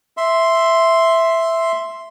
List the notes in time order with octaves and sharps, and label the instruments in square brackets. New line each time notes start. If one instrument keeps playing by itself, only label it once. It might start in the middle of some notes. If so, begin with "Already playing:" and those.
[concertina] E5 C6